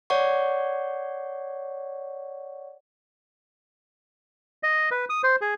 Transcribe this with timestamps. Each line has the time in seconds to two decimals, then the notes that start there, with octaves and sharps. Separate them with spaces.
0.10 C#5 D5 F#5 C#6
4.63 D#5
4.91 B4
5.09 D#6
5.24 C5
5.41 G#4